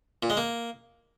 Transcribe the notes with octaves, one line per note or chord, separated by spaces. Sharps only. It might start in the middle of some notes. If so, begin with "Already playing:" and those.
A#2
G#3
A#3